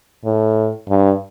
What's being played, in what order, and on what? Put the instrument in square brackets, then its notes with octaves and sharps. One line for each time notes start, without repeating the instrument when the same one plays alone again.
[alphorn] A2
G2